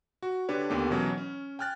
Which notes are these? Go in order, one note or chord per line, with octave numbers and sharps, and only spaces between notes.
F#4
D3 D4 G4 B4 C#5
D#2 D3 A3 B3 G4
B2 E3 F#3 C#4
C#4
G5 G#5 F6 F#6 A6